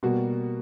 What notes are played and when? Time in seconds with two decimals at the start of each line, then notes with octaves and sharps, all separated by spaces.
0.03 B2 G3 A#3 F#4